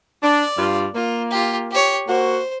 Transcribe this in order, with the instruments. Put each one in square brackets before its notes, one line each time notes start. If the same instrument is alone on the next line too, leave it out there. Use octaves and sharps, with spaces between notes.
[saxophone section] D4 [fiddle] D5
[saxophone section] G2 F4
[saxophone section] A#3 [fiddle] F4
[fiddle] F4 G4
G4 C#5
[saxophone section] A#3 F#4 [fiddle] C5